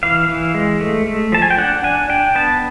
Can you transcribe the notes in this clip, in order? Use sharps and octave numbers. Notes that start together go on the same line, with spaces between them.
E3 F5
E3
G#3
A3
A3
F3 A5
G#5
G5
D4 F#5
D4 G#5
D4 G5
B3 A5